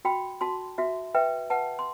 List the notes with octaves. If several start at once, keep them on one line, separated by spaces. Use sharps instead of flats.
F#4 G5 B5
F#4 A5 C6
F#4 E5
B4 E5 G5
B4 F#5 A5
C6